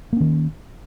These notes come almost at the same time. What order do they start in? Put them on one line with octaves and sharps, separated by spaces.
A#3 C#4 D#3